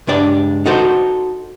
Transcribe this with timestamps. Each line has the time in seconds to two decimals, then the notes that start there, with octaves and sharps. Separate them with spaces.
0.07 C#2 G2 D4 D5
0.66 D#4 F#4 A4 C5